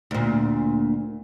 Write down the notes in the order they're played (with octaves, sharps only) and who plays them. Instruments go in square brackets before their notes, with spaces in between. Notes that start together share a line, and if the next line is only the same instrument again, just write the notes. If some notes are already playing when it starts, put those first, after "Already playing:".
[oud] D2 A#2